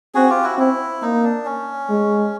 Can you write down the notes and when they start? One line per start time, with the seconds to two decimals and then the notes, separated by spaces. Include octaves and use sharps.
0.15 C4 F#4 G#4
0.30 F4 G4
0.44 E4 F#4
0.58 C4 E4
1.02 A#3 D#4
1.24 D4
1.45 C#4
1.90 G#3